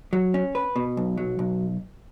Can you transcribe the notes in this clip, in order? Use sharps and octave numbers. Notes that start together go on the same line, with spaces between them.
F#3
C#4
B4
B2
B1
F#3
B1